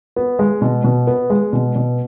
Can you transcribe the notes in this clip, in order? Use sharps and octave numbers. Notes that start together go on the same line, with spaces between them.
B3
G#3
B2
B2
B3
G#3
B2
B2